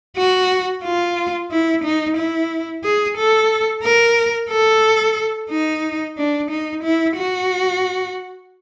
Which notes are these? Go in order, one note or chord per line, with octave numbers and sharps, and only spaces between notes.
F#4
F4
E4
D#4
E4
G#4
A4
A#4
A4
D#4
D4
D#4
E4
F#4